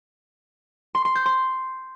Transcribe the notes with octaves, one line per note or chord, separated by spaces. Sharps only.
C6
C6
G6
C6